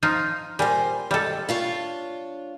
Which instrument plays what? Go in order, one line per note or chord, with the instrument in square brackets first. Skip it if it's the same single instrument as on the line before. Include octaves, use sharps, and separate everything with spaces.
[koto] F3 D#4 F4
[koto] A#2 G3 [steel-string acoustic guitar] C5 G#5
[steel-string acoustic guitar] D#2 G#2 [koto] G3 A4
[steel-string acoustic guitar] D4 F4 C#5